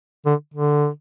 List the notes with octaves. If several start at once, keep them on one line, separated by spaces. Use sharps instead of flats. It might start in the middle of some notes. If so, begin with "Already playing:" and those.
D3
D3